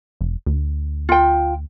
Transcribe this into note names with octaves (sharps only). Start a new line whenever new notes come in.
F1
D2
F4 G5